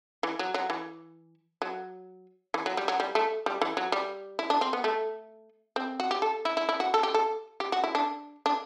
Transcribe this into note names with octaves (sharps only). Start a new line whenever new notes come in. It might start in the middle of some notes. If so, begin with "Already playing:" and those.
E3
F#3
F#3
E3
F#3
E3
F#3
G3
F#3
G3
A3
G3
E3
F#3
G3
E4
D4
C4
B3
A3
C4
F#4
G4
A4
E4
E4
E4
F#4
A4
G4
A4
G4
F#4
E4
D4
D4